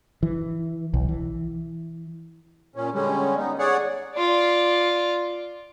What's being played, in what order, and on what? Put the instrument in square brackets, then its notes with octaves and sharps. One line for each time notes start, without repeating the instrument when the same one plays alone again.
[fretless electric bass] E3
B1
E3
[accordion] A#2 C#4
D3 G3 G#3 C#4
B3 D#4
G#4 C#5 D5 F#5
[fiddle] F4 D5